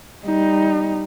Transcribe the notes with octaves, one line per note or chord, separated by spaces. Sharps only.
G3 D#4